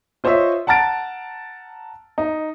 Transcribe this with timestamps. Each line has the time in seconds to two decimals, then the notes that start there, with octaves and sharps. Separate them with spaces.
0.24 F4 C5 C#5 D#5 E5
0.67 F#5 A5 A#5 F6 A6 D7
2.18 D#4